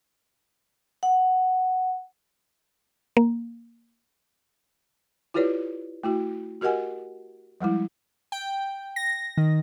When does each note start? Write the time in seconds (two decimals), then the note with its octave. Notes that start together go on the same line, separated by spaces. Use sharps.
1.03 F#5
3.17 A#3
5.34 E4 F4 G4 B4 C#5 D5
6.04 A3 E4 F#4
6.61 F#4 G4 A#4 D#5 F#5 G#5
7.61 F3 G3 G#3 E4
8.32 G5
8.96 A#6
9.37 D#3